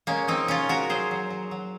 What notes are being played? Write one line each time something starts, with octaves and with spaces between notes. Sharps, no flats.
G#3 A#3 C#4
F3 C4 D#4
C3 C#4 F4
G#3 F#4 A#4
F#3 G#4 C5
F#3
F#3
F#3